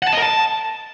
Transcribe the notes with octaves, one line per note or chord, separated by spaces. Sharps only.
F#5
A5
D#5
A#4
A5